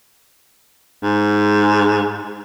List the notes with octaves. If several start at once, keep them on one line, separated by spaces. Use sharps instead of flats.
G#2